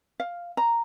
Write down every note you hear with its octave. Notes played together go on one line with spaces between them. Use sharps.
F5
A#5